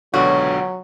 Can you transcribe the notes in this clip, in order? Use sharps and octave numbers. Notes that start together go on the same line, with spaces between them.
C#2 B2 D3 F#3 F#4 C#5